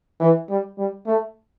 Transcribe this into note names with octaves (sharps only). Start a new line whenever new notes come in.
E3
G3
G3
A3